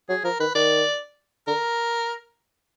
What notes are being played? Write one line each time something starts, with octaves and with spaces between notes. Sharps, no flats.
F#3 G#4
F3 A#4
D#3 B4
D#3 D5
D3 A#4